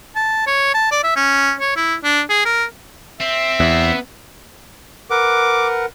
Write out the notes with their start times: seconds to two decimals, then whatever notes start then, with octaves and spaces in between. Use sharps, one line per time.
0.16 A5
0.47 C#5
0.74 A5
0.91 D5
1.03 E5
1.16 C#4
1.60 C#5
1.76 E4
2.04 D4
2.29 G#4
2.45 A#4
3.20 C4 E5
3.60 E2 B3
5.10 A#4 B4 F#5 D6